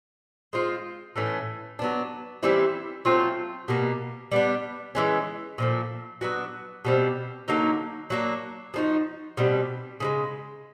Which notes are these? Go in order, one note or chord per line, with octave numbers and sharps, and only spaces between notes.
G#3 C4 F4
A2 E3 A3 C#4
F#3 B3 D4
E3 G3 C4 E4
F#3 A3 C4 F4
B2 G3 A#3
G3 B3 D4
E3 G#3 C#4
A#2 F3 A3
F#3 B3 D4 F#4
B2 G3 C4
D3 F#3 A#3 D#4
F#3 A#3 D4
F3 A#3 D#4 F#4
B2 G3 C4
C#3 F3 G#3